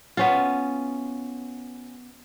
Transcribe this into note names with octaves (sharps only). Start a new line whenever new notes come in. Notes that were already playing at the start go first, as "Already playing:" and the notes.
B3 C#4 F4